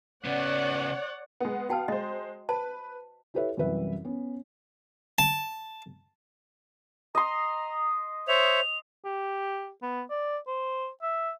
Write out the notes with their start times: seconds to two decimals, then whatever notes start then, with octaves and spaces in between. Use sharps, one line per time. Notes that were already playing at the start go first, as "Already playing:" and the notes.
0.25 C#3 B3 C#5 D5 F#5
1.40 G#3 B3
1.69 B3 F#4 F5 G5 A5
1.88 G#3 C5 D#5
2.49 B4 C5 A5
3.34 E4 G4 A4 B4 C#5 E5
3.57 C2 F#2 E3 B4 E5
4.05 B3 C#4
5.19 A5
7.15 D#5 A#5 C6
8.28 C5 C#5 E5 F7
9.05 G4
9.82 B3
10.10 D5
10.47 C5
11.02 E5